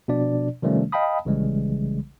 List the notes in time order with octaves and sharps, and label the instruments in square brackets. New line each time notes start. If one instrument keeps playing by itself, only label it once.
[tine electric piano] B2 F3 D4 D5
C3 D#3 F3 G3 A3 C#4
D#5 F5 G5 A5 B5 D#6
A#1 C#3 E3 G3 G#3